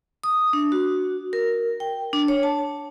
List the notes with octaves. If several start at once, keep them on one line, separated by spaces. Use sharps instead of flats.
D#6
D4
F#4
A#4
G5
D4
C#5
A5